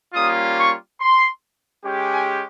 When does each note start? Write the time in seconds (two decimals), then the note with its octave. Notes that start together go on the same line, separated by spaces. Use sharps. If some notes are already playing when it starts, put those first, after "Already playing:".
0.14 G3 A#3 C#4 F4 D#6
0.57 C#6
1.00 C6
1.85 G#3 C#4 G4
2.13 G#5